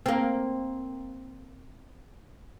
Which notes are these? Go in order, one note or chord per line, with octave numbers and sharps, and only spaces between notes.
A#3 C4